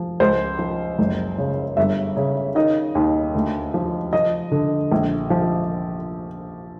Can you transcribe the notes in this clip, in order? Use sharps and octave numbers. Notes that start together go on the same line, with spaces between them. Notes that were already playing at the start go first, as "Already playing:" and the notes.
Already playing: F3
C#2 C5
F3
F#1
C#3
G1 E5
C#3
D#3 D#5
D#2
D2
F3
F3 D#5
D3
A#1
F3